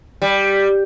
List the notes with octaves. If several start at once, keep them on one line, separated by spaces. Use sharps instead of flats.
G3